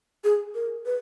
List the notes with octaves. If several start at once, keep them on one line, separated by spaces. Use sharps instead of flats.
G#4
A#4
B4